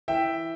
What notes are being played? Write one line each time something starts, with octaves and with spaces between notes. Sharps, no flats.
E3 E5 G5